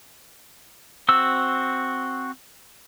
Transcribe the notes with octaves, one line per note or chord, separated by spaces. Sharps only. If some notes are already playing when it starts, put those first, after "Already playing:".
C4 F#4 E6